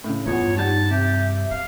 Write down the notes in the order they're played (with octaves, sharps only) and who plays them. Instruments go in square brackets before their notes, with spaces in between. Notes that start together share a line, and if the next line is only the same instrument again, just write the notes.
[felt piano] A2 C#3
[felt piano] E2 B3 F#5 [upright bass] G2 [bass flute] F4 [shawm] C#5
[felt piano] G3 F#5 G#6 [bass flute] D#4 [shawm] A5
[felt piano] C3 [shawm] G4 [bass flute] E5
[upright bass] F#3 [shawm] F5